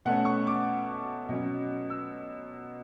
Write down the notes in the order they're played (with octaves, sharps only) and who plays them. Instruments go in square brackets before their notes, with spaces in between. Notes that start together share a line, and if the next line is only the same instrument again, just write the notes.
[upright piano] B2 A3 C#4 F#5
C#6
D6
B2 F#3 C#4
E6